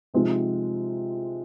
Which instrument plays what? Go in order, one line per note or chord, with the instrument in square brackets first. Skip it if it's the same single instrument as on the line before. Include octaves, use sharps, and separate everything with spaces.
[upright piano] C3 F3 G#3 C4 D#4